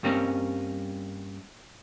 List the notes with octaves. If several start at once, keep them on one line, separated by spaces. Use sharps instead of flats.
G2 G3 A#3 C4 C#4